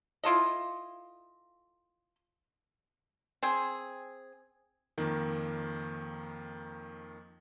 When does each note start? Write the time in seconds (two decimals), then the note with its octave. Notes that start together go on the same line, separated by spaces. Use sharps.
0.24 E4 F4 A4 D#5
3.43 C4 G#4
4.98 F2 D#3 A#3